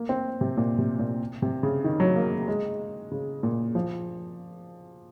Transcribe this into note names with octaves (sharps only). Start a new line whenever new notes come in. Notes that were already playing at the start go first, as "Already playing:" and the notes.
Already playing: A#3
C4
C3
A#2
C3
A#2
C3
C#3
D#3
F#3
A#3
G#3
C#3
A#2
F3